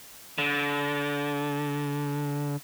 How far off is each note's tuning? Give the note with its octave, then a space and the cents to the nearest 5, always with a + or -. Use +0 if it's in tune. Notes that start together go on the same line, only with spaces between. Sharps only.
D3 -30